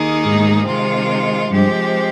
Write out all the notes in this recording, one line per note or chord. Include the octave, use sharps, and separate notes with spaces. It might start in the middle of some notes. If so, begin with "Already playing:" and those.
Already playing: D#2 D#3 A#3 D#4 G#4
G#2
C3 D#3 G#3 C4 F4
G2 F3 G#3 C4 G4